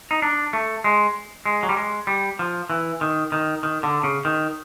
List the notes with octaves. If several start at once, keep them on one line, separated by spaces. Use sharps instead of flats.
D#4
D4
A3
G#3
G#3
F#3
G3
G#3
G3
F3
E3
D#3
D#3
D#3
D3
C#3
D#3